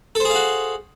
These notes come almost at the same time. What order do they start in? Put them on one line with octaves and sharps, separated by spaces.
A4 C5 G#4 F5 F#4